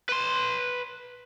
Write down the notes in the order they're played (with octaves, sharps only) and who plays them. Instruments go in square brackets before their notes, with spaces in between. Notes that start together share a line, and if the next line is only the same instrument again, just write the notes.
[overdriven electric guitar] B4 C6